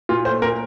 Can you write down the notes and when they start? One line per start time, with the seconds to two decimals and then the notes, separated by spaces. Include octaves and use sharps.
0.09 A#2 F4
0.25 A3 C5
0.42 A#2 A#4